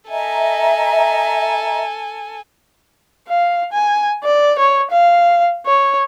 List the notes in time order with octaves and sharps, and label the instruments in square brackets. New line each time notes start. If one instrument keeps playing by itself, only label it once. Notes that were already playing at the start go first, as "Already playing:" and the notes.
[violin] A4 G#5 [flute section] D#5 E5 A#5
[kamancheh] F5
G#5
D5
C#5
F5
C#5